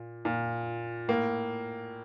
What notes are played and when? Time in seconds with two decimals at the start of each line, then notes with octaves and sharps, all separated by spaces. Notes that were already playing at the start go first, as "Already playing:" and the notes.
Already playing: A#2
0.25 A#2
1.08 A2 A#3